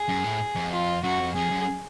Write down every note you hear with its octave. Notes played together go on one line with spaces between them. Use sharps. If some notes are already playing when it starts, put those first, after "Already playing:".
Already playing: G#4
F#2
A2
F2
F4
F#2 F#4
F2
F2 G#4
F#2